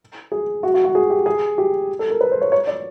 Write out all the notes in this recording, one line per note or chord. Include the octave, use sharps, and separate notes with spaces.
G#4
F#4
F#4
F#4
G#4
G4
G#4
G4
A4
A#4
B4
C5
C#5
C#5
D5